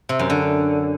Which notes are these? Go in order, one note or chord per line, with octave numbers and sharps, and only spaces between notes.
C3
F#2
D3